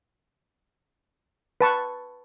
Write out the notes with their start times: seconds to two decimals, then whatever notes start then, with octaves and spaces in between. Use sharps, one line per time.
1.61 B4 A5 C#6